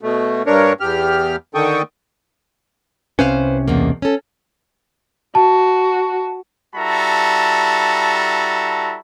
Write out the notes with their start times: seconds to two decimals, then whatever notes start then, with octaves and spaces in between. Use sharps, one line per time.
0.01 B2 A3
0.46 G2 D4 A#4 C#5
0.80 E2 G4 F6
1.55 D3 D#3 A4 G5 C#6 D#6
3.19 C2 C3 C#4 B4 C5 F5
3.68 E2 B2 A#3
4.02 C#4 A4
5.35 F#4 A5
6.76 G3 E4 F#4 A4 A5 A#5